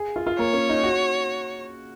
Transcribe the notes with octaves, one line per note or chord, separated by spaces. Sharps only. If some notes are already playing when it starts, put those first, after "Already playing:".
Already playing: G#4
F4
F4
A#3 C#5
C#4
D#4
F#4